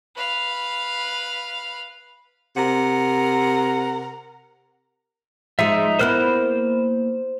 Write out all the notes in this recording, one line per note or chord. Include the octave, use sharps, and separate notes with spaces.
B4 F5
C3 A#4 F#5
F3 G#3 D#4 E5
A#3 B3 E4 C5 F6 F#6